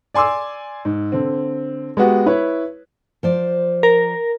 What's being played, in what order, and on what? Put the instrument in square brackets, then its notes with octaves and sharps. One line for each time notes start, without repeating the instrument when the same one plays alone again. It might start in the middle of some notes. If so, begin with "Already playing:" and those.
[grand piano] D5 G#5 C6 D6 E6
G#2
D3 C4
G#3 B3 F#4 G4
E4 B4 C#5
[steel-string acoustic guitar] F3 C5 D5
[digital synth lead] A#4